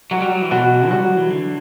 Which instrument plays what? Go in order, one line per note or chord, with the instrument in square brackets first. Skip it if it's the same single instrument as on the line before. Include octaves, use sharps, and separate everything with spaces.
[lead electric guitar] F#3 [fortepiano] F#4
[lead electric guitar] G3
F#3
E3
[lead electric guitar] B2 [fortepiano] F#4
[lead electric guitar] G3 [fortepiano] F#4
[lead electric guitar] F#3
E3
D3